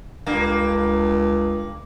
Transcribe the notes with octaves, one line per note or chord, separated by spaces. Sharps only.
C#2 G2 D3 A#3